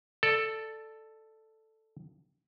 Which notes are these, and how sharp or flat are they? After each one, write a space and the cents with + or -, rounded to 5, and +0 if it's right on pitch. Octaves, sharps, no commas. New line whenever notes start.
A4 +0 D5 +20